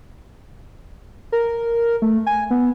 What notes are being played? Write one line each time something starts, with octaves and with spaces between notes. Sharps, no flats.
A#4
A3
G#5
B3